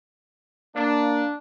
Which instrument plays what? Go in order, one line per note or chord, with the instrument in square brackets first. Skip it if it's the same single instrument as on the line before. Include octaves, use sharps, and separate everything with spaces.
[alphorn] A#3 [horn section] D4